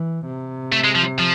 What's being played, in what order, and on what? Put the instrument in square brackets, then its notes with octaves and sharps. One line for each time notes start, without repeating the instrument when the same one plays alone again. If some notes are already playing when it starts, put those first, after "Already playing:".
Already playing: [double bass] E3
C3
[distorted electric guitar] A3
G#3
F3
F3